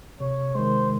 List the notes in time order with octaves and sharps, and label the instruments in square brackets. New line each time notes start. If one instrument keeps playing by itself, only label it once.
[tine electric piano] C3 [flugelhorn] C#5
[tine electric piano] D#3 G#3 [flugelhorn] C5